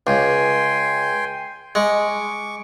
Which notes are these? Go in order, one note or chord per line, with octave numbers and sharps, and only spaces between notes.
C#2 G5 G#5 C6
G#3 C#6 D6